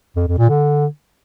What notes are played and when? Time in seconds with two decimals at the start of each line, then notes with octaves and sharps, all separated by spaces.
0.16 F2
0.27 F2
0.38 A#2
0.50 D3